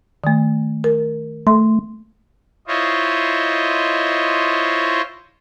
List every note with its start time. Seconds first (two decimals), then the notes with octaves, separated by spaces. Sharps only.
0.24 D#3 A3
0.84 A#4
1.47 A3 C6
2.68 E4 F4 C5 C#5 D#5